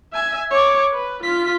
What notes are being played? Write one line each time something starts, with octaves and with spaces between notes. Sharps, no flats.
E5 G#5
C#5 D6
B4
F4 B6